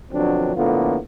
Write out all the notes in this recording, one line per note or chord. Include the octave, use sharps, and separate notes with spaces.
B2 D3 F3 F#3 C4 D4
F2 A2 D3 A#3 B3 F4